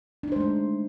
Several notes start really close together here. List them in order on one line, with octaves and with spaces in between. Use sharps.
D4 D#4 C5 G#3 A3